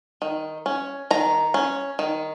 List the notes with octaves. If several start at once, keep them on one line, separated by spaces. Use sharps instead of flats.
D#3
C#4
D#3 A#5
C#4
D#3